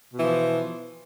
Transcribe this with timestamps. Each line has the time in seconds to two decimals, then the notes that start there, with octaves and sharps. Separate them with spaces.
0.13 B2
0.18 E3
0.22 F3